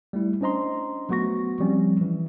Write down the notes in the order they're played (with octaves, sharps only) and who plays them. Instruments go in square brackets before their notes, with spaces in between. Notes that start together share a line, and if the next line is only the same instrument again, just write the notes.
[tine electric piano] G3 A3 E4
C#4 D4 C5 D#5 A#5 C6
F#3 A3 B3 F#4 C#6 A#6
F3 G3 C4 C#4
E3